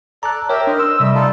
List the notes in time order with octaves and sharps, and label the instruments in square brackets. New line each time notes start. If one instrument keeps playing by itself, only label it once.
[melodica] A4 D5 [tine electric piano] A#5 F#6
[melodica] G4 E5 G5 [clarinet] A#4 [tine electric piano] C#5
[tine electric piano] D4 [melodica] B4 C5 D#5
[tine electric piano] C6 [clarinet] E6
[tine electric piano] C3 [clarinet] G3 [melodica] A3 D#5 E5
[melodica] D#4 F4 A4